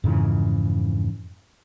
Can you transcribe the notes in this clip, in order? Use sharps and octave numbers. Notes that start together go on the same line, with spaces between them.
F2 G#2 C#3 E3